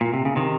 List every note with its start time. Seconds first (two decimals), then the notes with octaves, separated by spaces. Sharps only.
0.01 A#2
0.14 C3
0.25 C#3
0.36 C3 D#3